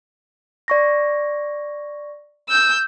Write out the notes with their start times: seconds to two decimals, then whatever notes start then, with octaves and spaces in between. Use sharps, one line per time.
0.68 D5 C#6 A#6
2.49 E6 G6